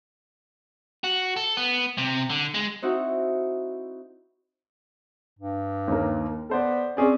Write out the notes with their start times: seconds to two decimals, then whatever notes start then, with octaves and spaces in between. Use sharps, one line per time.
1.04 F#4
1.36 A4
1.57 B3
1.98 C3
2.30 D3
2.54 G#3
2.82 C4 D#4 E4 F#4
5.39 G2
5.88 D#2 A#3
6.49 B3 A4 C5 D5
6.97 C4 C#4 G#4 D5